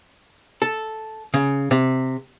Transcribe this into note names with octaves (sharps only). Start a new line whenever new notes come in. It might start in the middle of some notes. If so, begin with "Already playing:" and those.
A4
C#3
C3